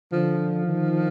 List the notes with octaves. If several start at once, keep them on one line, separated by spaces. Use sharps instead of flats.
D3 F3
D#3